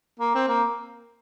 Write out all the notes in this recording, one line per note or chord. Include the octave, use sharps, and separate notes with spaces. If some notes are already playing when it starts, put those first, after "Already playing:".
A#3
C4
A#3